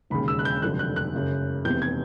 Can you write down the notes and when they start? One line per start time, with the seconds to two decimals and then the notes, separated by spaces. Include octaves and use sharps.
0.10 E1 D#2 C#3 B5
0.28 E6
0.39 F#6
0.45 G6
0.62 F1 F2 D3 F#3 F#6
0.79 F#6
0.96 F#6
1.14 F#1 F#2 C#3
1.65 F1 E2 C3 G6
1.82 G#6